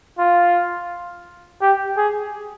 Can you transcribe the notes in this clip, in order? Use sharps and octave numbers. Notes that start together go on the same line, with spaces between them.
F4
G4
G#4